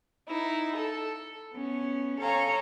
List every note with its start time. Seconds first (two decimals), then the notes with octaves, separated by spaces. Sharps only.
0.27 D#4 E4
0.75 A4
1.53 B3 C#4
2.20 A4 C#5 F5 G#5 A#5